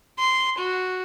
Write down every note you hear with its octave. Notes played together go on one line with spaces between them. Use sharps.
C6
F#4